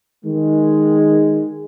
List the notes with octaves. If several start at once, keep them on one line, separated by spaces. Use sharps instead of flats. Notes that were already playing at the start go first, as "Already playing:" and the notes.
D#3 G#3